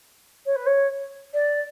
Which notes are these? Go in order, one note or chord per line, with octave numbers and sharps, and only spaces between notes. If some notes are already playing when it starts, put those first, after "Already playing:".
C#5
B4
C#5
D5